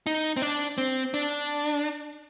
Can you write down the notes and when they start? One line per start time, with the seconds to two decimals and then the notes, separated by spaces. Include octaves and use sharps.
0.07 D#4
0.37 C4
0.42 D4
0.78 C4
1.14 D4